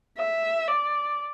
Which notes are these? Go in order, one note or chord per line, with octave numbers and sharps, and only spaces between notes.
E5
D5